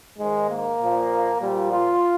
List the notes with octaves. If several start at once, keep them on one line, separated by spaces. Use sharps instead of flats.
G#2 D#3 G#3
A#3
A#2 F3
A#2 F3 G3
F4